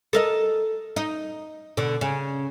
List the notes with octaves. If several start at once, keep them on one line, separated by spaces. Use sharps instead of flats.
A4 A#4 D#5
D#4
B2 D3
C#3